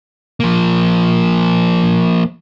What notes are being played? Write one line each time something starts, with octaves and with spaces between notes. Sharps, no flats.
F3 A#3